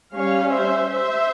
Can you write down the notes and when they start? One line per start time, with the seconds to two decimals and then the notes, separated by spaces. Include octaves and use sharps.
0.14 G3 C#4 C#5 F5
0.52 C5 E5
0.90 C5 E5